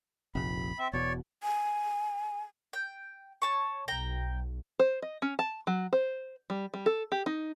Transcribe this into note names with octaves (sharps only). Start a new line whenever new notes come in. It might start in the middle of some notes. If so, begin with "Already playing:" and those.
F1 A#1 C3 B5
C4 E5
E1 B2 C#5 D5
G#5
G5
C#5 A5 C#6
B1 G5 A#5
C5
D#5
C#4
A5
F#3
C5
G3
G3
A4
G4
D#4